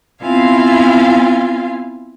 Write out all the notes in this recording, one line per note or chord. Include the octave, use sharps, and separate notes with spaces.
B3 C4 E4 F4 F5 G#5